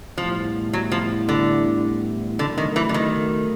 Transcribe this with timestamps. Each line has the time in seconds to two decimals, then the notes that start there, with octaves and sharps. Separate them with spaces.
0.18 A2 E3 F3 G3 B3 E4
0.73 F#3
0.92 F3
1.29 D3
2.39 B1 B2 D3 F#3 A3
2.58 D#3
2.76 E3
2.89 D3
2.94 D#3